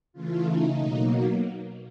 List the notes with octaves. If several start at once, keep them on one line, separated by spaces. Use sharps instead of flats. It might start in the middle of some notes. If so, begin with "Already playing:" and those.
C#3 E3 A3 F4
D#4
B2 F#3 A#3